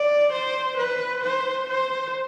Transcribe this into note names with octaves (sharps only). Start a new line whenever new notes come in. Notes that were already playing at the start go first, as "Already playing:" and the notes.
Already playing: D5
C5
B4
C5
C5